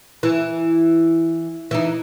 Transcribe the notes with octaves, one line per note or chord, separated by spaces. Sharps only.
E3
E3 D#4